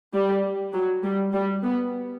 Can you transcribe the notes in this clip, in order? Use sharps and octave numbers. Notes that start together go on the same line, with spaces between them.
G3
F#3
G3
G3
B3